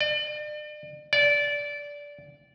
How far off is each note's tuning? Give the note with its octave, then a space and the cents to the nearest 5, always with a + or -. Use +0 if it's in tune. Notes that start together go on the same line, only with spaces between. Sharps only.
D5 +40
D5 -15